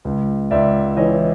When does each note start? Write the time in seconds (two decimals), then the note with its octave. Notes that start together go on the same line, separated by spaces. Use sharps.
0.05 C#2
0.51 C#2 D5 E5
0.97 E3 C#5 D#5